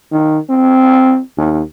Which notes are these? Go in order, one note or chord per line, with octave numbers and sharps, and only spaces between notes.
D#3
C4
D#2